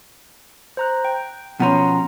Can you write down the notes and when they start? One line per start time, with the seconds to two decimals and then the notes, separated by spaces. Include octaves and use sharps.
0.77 C5 A#5 F#6
1.05 G5
1.60 B2 F3 C#4 F#5 A#5 C6